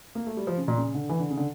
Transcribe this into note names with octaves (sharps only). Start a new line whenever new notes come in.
A#3
A3
G3
F3
C#3
A#2
C#3
D3
E3
D3
C#3
D3